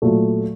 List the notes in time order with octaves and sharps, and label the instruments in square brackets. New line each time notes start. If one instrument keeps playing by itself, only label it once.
[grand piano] A#2 F#3 A3